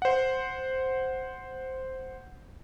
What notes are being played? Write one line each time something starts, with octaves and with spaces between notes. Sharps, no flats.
C5 F#5